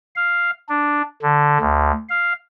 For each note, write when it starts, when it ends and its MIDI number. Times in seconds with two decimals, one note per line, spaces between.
0.16 0.50 77
0.69 1.02 62
1.22 1.58 50
1.60 1.92 38
2.09 2.33 77